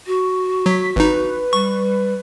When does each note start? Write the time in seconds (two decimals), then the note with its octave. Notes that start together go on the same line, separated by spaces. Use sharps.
0.07 F#4
0.66 F#3 B6
0.96 G#1 D#4 B4
1.53 G3 C#6